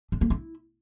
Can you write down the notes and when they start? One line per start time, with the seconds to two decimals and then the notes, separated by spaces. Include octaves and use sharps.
0.12 D4
0.21 A#3
0.30 E4